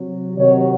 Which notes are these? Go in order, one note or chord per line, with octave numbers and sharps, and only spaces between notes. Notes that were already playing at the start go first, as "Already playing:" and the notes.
Already playing: C3 F#3
C3 D#3 F#3 C#5